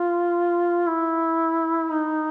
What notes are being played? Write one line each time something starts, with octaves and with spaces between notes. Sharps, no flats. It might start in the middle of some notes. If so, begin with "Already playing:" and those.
Already playing: F4
E4
D#4